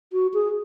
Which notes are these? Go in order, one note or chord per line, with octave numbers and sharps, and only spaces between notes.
F#4
G#4